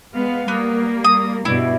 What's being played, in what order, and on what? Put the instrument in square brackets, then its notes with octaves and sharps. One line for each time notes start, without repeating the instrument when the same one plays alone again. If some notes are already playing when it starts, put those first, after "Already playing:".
[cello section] G#3 B3 F5
[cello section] G3 A#3 [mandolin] B3
[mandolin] D#6
[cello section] G2 B2 G3 [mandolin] E4